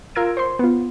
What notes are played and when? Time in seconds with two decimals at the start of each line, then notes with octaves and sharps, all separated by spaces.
0.15 F4 A#4 E6 G#6 D7
0.37 C5 C6
0.59 B3 F4